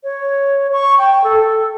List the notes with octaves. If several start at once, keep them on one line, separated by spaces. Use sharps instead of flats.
C#5
C#6
G5
A4